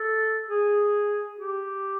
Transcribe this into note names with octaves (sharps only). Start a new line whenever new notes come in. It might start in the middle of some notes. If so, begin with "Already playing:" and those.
Already playing: A4
G#4
G4